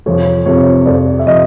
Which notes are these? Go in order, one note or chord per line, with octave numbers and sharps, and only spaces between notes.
F2 C3 F3 C#5
F2 C3 F3 C#5
F2 C3 F3 D5
E5
C3 F3 D#5